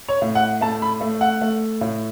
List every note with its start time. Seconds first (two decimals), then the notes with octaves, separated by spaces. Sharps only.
0.09 C#5
0.22 A2
0.35 F#5
0.61 A3 A5
0.82 B5
1.01 A3
1.21 F#5
1.42 A3
1.81 A2